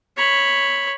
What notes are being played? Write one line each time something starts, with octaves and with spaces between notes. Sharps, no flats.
C#5 B5